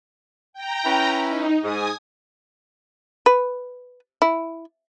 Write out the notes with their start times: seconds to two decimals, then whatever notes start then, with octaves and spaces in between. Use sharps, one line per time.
0.53 G5 A#5
0.85 C#4 E4 B4
1.28 D#4
1.64 G#2 G#5 D#6
3.26 B4
4.22 E4